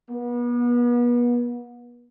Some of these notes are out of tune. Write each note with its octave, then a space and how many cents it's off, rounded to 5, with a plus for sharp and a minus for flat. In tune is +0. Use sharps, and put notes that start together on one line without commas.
B3 -35